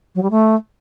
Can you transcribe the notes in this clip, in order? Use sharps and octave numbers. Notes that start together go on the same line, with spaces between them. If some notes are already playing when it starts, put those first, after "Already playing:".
F#3
G3
A3